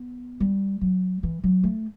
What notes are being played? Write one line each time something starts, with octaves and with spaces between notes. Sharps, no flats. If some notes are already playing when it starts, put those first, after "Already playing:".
Already playing: B3
G3
F#3
E3
F#3
A3